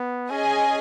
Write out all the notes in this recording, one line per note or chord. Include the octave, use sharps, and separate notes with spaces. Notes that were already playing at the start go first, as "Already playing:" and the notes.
Already playing: B3
C#4 G#4 D#5 G#5